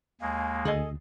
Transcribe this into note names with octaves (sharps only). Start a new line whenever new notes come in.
D#2 G#3 A#3 G#5
D2 G#4 A4 D#5